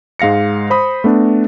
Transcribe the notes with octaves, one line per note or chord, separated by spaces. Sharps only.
G#2 G#3 F5 A#6 C#7
C5 B5 D#6
A3 B3 D4